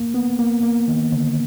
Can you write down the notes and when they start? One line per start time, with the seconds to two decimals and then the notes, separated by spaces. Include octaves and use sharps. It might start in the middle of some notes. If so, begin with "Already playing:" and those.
Already playing: A#3
0.14 B3
0.39 A#3
0.63 A#3
0.88 D#3
1.12 D3